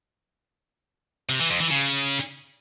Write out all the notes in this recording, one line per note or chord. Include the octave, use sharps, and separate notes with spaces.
C3
E3
F2
E3
C#3